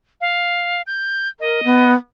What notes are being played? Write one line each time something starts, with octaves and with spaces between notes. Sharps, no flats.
F5
G6
A#4 D#5
B3